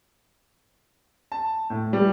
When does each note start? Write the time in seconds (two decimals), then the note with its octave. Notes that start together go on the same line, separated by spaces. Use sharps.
1.32 A5
1.70 A2
1.93 G3